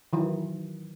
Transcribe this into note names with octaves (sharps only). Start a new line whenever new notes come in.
D#3 E3 F#3